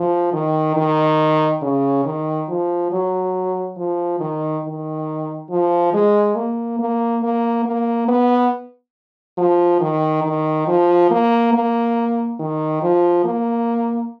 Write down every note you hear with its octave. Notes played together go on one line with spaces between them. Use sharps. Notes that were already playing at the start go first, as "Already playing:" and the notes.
Already playing: F3
D#3
D#3
C#3
D#3
F3
F#3
F3
D#3
D#3
F3
G#3
A#3
A#3
A#3
A#3
B3
F3
D#3
D#3
F3
A#3
A#3
D#3
F3
A#3